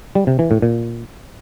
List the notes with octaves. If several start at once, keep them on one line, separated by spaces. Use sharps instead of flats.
G3
C3
E3
A2
A#2